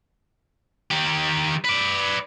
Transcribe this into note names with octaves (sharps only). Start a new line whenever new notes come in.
D#3 G4
B4 D5